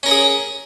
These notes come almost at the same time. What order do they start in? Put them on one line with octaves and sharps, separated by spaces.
C#4 A#4 C#5 G#4